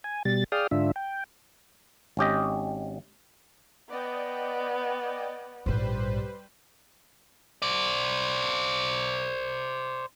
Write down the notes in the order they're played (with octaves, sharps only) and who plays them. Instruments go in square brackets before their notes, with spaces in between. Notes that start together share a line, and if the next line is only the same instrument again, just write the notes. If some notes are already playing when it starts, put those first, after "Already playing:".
[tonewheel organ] G#5
B2 G3 A6
G#4 D5 F5 G5 D#6 F6
G#2 D3 D4 F4 E5
G5
[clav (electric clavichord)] G#1 C#4 G4 D#5
[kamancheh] B3 [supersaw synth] D5 D#5 G5
[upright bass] A#1 G#2 [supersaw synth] G3 B4 C5
[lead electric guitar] C5 D5